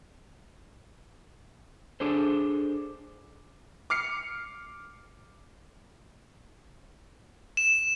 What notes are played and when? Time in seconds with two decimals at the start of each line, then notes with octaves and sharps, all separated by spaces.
2.00 D4 G#4 A4 C5
3.90 D6 F6 C7 C#7
7.57 E7